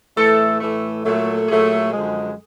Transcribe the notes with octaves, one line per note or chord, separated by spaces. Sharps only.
A2 E3 A3 A4
A2 E3 A3
A#2 F#3 A3
A#2 F#3 A3 G#4
F#2 D3 F3 G#3